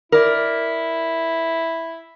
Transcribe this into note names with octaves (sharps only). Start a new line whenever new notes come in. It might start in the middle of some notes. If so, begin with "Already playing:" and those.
E4 A#4 D5